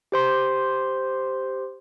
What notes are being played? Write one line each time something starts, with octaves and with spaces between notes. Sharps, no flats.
G4 C5 C6